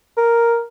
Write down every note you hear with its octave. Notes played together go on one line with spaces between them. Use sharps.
A#4